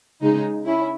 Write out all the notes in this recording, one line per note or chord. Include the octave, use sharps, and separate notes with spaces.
C#3 G#3 D#4
C#4 E4